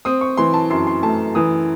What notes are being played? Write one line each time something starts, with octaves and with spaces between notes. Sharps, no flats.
C4 D#6
C#6
E3 C6
A5
F#2 C6
C6
A3 A5
E3 D#6